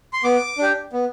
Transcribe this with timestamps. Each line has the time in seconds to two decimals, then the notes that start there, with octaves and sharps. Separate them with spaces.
0.13 C6
0.24 B3 D6
0.58 D4 G4
0.93 B3